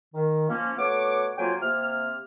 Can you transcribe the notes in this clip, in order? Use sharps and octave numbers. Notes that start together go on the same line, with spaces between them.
D#3
F3 A#3 C#4
B2 A3 C#5 F#5 D6
F2 F#3 A#3 F4 G5 G#5
C3 A#3 F6